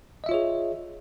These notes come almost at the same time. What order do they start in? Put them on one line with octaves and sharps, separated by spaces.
D#5 E5 F4 C#5 G#4